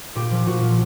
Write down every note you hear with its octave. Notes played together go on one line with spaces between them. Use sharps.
A#2 G4
F3
A#2 F#4
F3